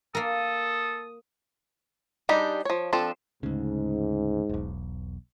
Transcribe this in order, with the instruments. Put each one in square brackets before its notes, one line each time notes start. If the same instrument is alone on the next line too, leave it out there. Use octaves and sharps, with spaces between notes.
[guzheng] A#3 A#4 [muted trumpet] A4 [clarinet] D#6
[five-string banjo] G3 D4 D#4 G4 G#4
F3 C#5
F3 C4 D4 A4
[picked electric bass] D2 C#3 [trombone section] G#2
[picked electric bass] E1 B1